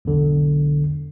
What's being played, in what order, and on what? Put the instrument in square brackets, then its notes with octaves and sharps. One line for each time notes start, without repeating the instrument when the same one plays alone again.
[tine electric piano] B1 E2 D3